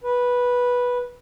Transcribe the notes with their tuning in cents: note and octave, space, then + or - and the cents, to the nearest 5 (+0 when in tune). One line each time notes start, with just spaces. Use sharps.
B4 -10